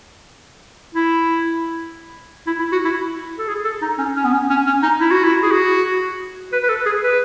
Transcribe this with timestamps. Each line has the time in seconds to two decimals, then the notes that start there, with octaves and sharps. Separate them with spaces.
0.95 E4
2.47 E4
2.59 E4
2.72 F#4
2.85 E4
3.38 A4
3.48 G#4
3.65 A4
3.82 D#4
3.98 C#4
4.16 C#4
4.25 B3
4.33 C#4
4.50 C#4
4.67 C#4
4.83 D#4
5.01 E4
5.11 F#4
5.24 E4
5.43 G#4
5.51 F#4
6.52 B4
6.63 B4
6.69 A4
6.86 G#4
7.03 B4